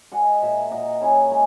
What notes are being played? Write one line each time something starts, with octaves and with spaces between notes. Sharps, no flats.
G#3 D#5 F#5
A#2 E5 G#5
A#2 D#5 F#5
C#4 E4 G#4
G#3